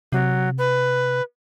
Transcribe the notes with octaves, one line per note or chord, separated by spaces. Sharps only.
C3 F#3
B4